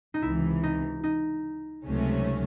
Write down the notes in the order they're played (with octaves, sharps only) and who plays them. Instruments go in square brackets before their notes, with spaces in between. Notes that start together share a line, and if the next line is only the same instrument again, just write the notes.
[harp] D#4
[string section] C#2 C3 E3 [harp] E4
[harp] D#4
D#4
[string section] C#2 C3 F#3 A3 C#4